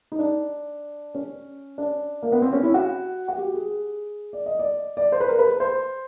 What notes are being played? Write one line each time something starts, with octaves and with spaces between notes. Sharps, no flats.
D#4
D4
C#4
D4
A#3
B3
C4
C#4
E4
F#4
F#4
G4
G#4
D5
D#5
D5
D5
C5
B4
A#4
B4
C5